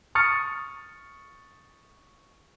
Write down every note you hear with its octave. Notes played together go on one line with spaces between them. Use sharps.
C#6 D#6 F6 A6 C#7